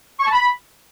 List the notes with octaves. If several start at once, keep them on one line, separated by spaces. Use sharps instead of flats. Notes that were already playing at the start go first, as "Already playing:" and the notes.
C#6
A5
B5